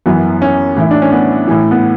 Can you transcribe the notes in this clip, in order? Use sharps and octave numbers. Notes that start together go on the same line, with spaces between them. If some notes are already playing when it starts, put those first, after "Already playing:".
F#2 E3 B3
C#4
A2 E3 E4
D4
C#4
B3
A2 E3
B3